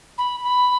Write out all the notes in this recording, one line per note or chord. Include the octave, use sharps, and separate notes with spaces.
B5
B5